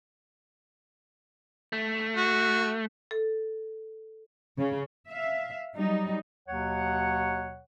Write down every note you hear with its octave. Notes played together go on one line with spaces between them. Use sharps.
A3
F#4
A4
C#3
E5 F5
F#3 G3 D#4
D#2 B2 F#3 C#5 F#5